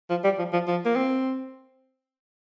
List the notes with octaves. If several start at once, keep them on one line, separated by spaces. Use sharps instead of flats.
F3
G3
F3
F3
F3
A#3
C4